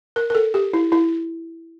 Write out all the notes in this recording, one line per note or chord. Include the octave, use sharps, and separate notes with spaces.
A#4
A#4
A4
G4
E4
E4